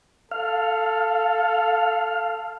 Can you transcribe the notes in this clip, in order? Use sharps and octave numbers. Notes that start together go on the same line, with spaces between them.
A4 F5